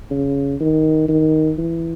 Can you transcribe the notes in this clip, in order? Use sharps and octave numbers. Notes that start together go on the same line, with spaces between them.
C#3
D#3
D#3
E3